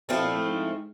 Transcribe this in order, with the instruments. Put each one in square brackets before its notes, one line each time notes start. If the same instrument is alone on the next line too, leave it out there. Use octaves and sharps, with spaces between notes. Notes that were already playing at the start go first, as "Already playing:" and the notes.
[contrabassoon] B2 [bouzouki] F3 A3 C4 E4
[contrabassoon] A#2
A2
G#2